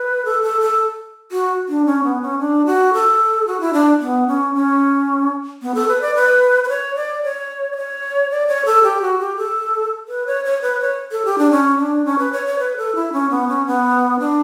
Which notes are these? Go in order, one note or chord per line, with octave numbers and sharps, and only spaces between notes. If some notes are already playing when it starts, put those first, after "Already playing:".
Already playing: B4
A4
A4
A4
F#4
D4
C#4
B3
C#4
D4
F#4
A4
F#4
E4
D4
B3
C#4
C#4
B3
A4
B4
D5
B4
B4
C#5
D5
C#5
D5
C#5
D5
C#5
A4
G4
F#4
G4
A4
B4
C#5
C#5
B4
C#5
A4
G4
D4
C#4
D4
C#4
B4
C#5
C#5
B4
A4
E4
C#4
B3
C#4
B3
D4